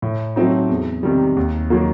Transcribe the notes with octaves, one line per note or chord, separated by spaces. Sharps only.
A2
F#3 A3 C4 D#4
E2
C3 D#3 G3
D#2
D#3 F#3 A#3